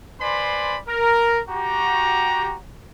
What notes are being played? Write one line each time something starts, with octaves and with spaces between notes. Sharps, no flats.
B4 C5 D5 G#5 B5 C6
A#4
F#4 G4 A#5